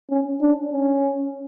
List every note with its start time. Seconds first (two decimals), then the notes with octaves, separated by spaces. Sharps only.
0.10 C#4
0.41 D4
0.72 C#4